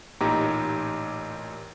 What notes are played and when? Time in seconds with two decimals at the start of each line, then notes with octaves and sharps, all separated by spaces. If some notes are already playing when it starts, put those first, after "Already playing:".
0.21 A1 A#2 D#4 G4 A#5